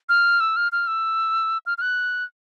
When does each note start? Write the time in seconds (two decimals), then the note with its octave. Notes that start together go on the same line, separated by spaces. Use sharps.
0.09 F6
0.40 E6
0.56 F6
0.72 F6
0.87 E6
1.66 F6
1.78 F6
1.81 F#6